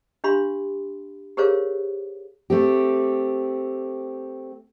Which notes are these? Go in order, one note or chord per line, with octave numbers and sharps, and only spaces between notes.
D4 G4 F5 B5 C6
G4 G#4 A#4 C5 C#5 F5
A3 C4 G4